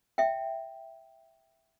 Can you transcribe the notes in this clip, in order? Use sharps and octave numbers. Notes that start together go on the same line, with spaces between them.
E5 G5